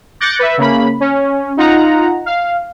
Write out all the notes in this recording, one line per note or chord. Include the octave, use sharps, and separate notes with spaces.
D6 F#6 G6 A6 A#6 C#7
B4 E5
C#3 A#3 B5
C#4
D#4 F4 F#5 A#5
F5